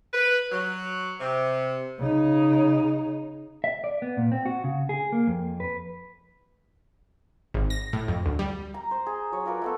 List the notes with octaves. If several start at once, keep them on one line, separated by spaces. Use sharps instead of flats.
B4
F#3
C3
C#3 D#4
E5
D5
B3
A#2
C4
F#4
C#3
G#4
A#3
F2
B4
G#1
A#6
A2
F2
D2
G3
A#5
C5
G#4
F#3 C#5
F4 A#4 B4 D5
A3 B3 A4